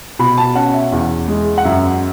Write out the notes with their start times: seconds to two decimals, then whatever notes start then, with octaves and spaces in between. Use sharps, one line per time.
0.19 B2 B5
0.38 A5
0.55 C#4 F#5
0.74 E5
0.92 E2
1.28 G#3
1.58 F#5
1.64 F#2 E5